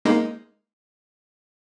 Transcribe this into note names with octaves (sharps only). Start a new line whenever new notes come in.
G#3 A#3 D#4